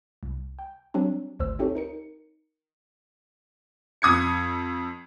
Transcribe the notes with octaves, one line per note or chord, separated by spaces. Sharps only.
C2
G5
F#3 G3 C4 D4
G#1 D2 C5 E6
C4 D#4 G4 A4 C#5
D#4 A#4 C#7
F2 D#6 G#6 C#7